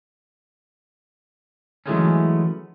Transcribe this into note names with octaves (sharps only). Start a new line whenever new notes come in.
E3 F#3 G#3 A3 B3 C#4